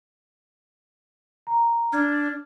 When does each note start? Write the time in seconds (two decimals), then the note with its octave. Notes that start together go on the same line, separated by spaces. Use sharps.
1.47 A#5
1.92 D4 F6 G#6